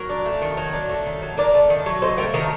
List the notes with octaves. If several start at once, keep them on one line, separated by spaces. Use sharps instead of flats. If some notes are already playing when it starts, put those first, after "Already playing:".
Already playing: F#3 A#4
D4
A3
D#3
F#3
D4
A3
D#3
F#3
D4 A#4 D5
A3
D#3
F#3
D#4 A4 C5
A3 G4 A#4
D#3 G4 A#4